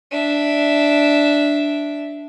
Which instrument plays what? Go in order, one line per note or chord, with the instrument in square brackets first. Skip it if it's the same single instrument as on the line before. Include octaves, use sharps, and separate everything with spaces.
[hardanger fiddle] D4 E5